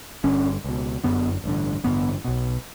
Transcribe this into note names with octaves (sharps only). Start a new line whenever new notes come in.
G1 G2 D3 C#4
C#2 B2
G1 F#2 D3 B3
A1 G2 D3
A1 G2 D3 B3
B1 B2